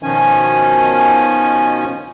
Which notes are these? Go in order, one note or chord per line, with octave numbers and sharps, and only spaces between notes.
B2 D#3 F3 C#4 G#5